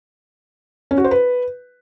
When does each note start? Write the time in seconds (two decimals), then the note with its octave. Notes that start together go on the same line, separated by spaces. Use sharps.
0.91 C#4
0.98 F#4
1.04 C5
1.11 B4